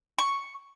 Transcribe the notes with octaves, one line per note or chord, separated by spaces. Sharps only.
C#6